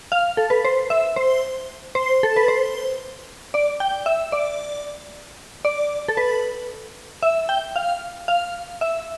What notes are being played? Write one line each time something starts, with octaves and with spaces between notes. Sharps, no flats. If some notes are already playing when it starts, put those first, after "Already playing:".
F5
A4
B4
C5
E5
C5
C5
A4
B4
C5
D5
G5
E5
D5
D5
A4
B4
E5
G5
F5
F5
E5